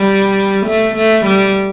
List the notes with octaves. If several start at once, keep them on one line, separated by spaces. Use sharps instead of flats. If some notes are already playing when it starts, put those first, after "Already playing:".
Already playing: G3
A3
A3
G3